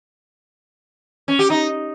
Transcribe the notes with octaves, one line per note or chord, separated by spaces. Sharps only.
C#4
G4
D#4